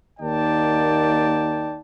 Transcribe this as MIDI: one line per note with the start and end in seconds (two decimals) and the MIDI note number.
0.20 1.78 39
0.20 1.78 58
0.20 1.78 63
0.20 1.78 74
0.20 1.78 79
0.20 1.78 81